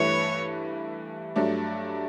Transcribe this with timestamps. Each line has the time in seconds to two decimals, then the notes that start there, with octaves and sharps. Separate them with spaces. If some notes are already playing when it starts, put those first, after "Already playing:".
Already playing: G2 E3 A3 E4 B4 C#5
1.36 G2 F#3 A3 D4